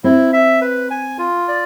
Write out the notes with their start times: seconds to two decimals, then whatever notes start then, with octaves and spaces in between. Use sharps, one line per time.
0.04 C4 E4
0.33 E5
0.61 B4
0.91 G#5
1.19 F4
1.48 D5